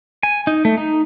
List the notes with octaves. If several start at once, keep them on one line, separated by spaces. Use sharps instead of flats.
G#5
D#4
A3
D#4